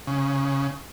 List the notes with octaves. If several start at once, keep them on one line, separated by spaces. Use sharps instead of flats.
C#3